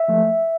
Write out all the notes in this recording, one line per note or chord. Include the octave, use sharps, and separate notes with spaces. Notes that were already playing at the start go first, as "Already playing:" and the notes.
Already playing: E5
F3 A3